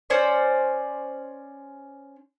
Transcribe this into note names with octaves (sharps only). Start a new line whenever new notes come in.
C#4 C5 D5